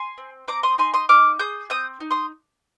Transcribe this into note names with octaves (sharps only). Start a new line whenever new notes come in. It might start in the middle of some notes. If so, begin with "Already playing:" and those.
Already playing: G#5 C6
C4
C4 A#5 D6
C6 D#6
D#4 G#5 C6
C6 D#6
D#4 D6 F6
G#4 D#6 G6
C4 D#6 G6
D#4
C6 D#6